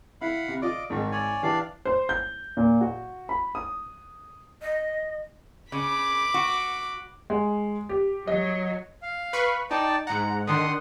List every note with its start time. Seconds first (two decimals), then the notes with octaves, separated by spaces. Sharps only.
0.21 E4 F5 F#5 B5
0.48 C3
0.62 F4 D5 D#5 D6
0.90 G#1 G#2 D#3
1.12 C#5 D5 G#5
1.43 E3 D4 G4 D5 F5
1.85 C5
2.09 G6
2.57 A#2
2.81 F#4
3.29 B5
3.55 D#6
4.62 D#5
5.72 C#3 B5 D6
6.34 F#4
7.30 G#3
7.89 G4
8.27 F#3 D#5
9.03 F5
9.33 B4 B5 C#6
9.71 D#4 D5 G5 A5
10.07 G#2 F#5 A#5
10.47 D3 D#3 F#5 C6 D#6